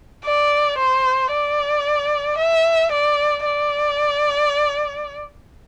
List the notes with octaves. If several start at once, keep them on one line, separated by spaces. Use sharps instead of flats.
D5
C5
D5
E5
D5
D5